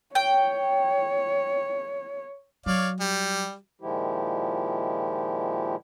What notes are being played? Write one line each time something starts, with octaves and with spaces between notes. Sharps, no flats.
C#5 G5
F#3 C#5 D5 F5
G3
A#2 D#3 F3 G#3 E4 G4